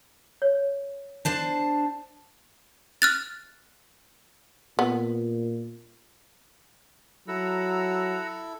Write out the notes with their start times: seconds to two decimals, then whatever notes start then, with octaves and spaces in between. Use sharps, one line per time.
0.42 C#5
1.25 D4 C5 A5
3.02 F6 F#6 A6
4.79 A#2 B3
7.28 F#3 E4 A4 F#5 A#5 E6